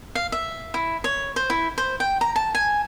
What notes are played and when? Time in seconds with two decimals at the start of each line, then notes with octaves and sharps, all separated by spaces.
0.15 F5
0.32 E5
0.74 E4
1.04 C#5
1.36 C5
1.50 E4
1.78 C5
2.00 G5
2.21 A#5
2.36 A5
2.55 G#5